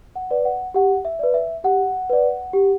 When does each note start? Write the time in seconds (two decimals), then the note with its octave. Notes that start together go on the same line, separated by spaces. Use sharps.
0.16 F#5
0.31 B4 D5
0.45 F#5
0.74 G4 F#5
1.05 E5
1.19 B4 D5
1.34 E5
1.64 G4 F#5
2.10 B4 D5
2.53 G4